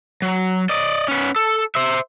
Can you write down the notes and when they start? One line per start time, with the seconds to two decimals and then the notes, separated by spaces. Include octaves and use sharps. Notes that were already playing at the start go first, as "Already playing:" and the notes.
0.22 F#3
0.69 D5 D#5
1.08 B3 C#4
1.36 A4
1.75 C5 E5